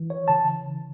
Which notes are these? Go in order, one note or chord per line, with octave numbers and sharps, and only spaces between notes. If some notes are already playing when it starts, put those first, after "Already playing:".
Already playing: E3
C#5
C#3 E3 A5